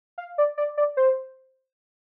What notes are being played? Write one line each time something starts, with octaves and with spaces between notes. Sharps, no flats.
F5
D5
D5
D5
C5